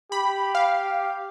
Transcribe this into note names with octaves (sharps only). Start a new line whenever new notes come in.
G4 B5
F5